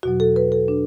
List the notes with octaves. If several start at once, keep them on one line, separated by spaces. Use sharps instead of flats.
E2 B2 F#3 F#4
A4
B4
A4
D4